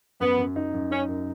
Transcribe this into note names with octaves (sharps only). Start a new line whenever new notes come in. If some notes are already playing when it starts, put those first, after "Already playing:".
F#2 B3
F#2
D#4
F#2
C#4 D#4
F#2